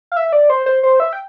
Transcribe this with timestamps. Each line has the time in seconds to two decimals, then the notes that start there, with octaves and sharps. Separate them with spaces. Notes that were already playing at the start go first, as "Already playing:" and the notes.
0.12 F5
0.16 E5
0.33 D5
0.50 C5
0.66 C5
0.83 C5
1.00 E5
1.13 G5